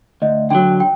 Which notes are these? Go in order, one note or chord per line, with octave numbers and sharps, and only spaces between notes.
D2 D#5
D3 F#3 G5
G5